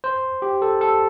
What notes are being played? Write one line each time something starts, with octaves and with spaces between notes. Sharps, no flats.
C5
G4
A4
A4